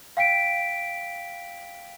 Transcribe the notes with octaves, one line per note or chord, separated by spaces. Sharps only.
F5 G5 B6 D7